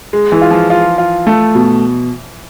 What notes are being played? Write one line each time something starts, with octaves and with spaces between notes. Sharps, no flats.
G#3
E3
F4
F3
F4
F4
A3
B2